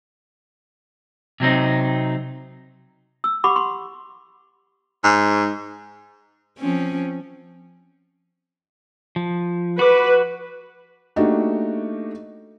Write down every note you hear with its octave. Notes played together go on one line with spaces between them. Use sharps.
C3 F#3 C4 D#4
E6
G4 F#5 B5 C#6 D6
C6
G#2
F3 C4 C#4
F3
F#4 B4 D6
A3 A#3 D4 D#4 F#4 G4